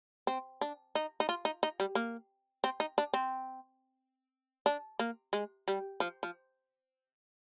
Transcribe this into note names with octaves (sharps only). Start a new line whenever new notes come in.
C4
D4
D#4
D#4
F4
D#4
D#4
G3
A#3
C4
D#4
D4
C4
D4
A#3
G#3
G3
F3
F3